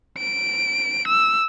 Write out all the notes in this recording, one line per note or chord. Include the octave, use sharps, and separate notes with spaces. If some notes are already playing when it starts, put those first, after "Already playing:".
D7
E6